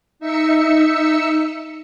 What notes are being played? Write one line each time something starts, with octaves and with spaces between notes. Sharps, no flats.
D#4 E5 E6 C#7